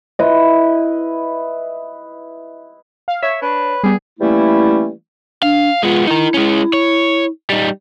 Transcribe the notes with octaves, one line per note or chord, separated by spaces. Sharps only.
E4 B4 D#5
F5
C#5 E5
D4 B4
G3 B3 G#4
E3 G3 A3 A#3 C#4 E4
D4 F5
G#3 B3 F4
D#4 E4 A#4
G#3 C#4
C#5
G3 D#4